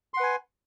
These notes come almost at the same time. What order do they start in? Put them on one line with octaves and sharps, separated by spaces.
C6 F#5 B4 G#5